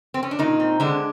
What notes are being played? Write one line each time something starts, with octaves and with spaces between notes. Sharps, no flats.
C4
C#4
D4
A#2 D#3 D#4
C4
D3 G#3 D4